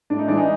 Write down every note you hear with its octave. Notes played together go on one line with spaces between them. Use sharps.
A2 D4
D#4
E3 G#3 D4
D#4